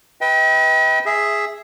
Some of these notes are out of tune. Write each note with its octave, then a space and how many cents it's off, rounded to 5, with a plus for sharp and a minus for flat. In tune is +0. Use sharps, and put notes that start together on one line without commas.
B4 +0 D#5 +45 G5 +0
G#4 +0 E5 +0